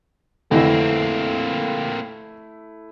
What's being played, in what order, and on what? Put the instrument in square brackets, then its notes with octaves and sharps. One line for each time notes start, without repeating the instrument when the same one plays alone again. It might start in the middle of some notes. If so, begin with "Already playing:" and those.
[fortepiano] F2 D3 E3 [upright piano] A3 E4 [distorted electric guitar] A#3 C4